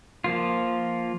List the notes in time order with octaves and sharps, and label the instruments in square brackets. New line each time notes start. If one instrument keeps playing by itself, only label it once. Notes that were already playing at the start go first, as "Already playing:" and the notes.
[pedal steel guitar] F3 A#3 F4